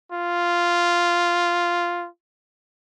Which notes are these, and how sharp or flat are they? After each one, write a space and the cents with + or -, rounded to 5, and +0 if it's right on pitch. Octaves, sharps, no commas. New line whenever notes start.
F4 -5